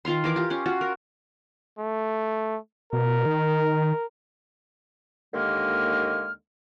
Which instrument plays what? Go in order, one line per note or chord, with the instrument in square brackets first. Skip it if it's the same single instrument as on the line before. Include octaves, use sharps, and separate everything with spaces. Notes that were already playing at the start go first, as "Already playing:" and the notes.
[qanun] D#3 F4 F5 C6
E3 A#4 D6
F4 G4
C#4 F4
F4 F#4
A#4
[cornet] A3
[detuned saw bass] B2 [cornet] A#4
[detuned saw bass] D#3
[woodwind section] D#2 D3 D#3 G#3 A#3 F6